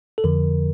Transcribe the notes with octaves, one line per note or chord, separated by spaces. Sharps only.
A4
F2 D3 F3 A#4